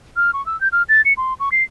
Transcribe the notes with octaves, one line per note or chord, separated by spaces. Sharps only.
F6
C#6
E6
G6
F6
A6
C#7
C6
C#6
C7